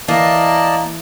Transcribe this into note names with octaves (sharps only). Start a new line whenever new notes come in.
E3 A#3 D5 D#5 A5